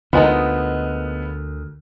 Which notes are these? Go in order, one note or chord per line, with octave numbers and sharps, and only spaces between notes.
D2 D3 F3 G#3 B3 D#4 A#4